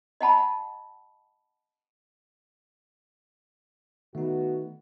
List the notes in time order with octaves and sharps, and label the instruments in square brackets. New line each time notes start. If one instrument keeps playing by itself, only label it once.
[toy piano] D#5 F#5 A5 B5
[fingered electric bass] D#3 [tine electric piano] A3 D#4 [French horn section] B3 [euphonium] F#4